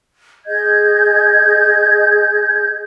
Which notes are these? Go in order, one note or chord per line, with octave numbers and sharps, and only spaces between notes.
G#4 D#5 G6 G#6